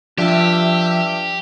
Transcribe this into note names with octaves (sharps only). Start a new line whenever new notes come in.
G2 F3 G4 E5